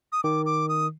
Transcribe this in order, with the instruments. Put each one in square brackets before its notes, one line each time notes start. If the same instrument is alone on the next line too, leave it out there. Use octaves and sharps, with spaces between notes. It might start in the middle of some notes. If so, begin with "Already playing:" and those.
[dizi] D#6
[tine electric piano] D#3 [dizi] D6
[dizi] D6
D#6